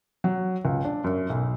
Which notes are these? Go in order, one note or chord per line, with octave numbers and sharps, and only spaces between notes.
F#3
C#2
D4
F#2
B1